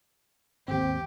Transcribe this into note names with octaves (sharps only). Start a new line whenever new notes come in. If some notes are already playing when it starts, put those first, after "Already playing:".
G#1 D#2 C4 G4